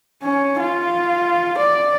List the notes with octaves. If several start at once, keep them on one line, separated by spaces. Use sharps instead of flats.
C#4
F4
D5